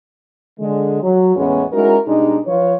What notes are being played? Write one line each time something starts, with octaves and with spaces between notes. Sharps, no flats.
D3 G#3
F#3
E2 A2 G#3 B3 C#4
G#3 C#4 D#4 E4 F#4 A#4
B2 G3 G#3 D4 D#4
F3 F4 B4 C#5